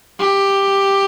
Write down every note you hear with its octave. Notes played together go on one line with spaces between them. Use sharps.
G4